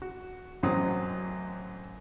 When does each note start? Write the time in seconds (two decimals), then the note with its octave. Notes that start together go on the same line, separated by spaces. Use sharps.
0.02 F#4
0.63 A1 F#2 F#3 C4 D#6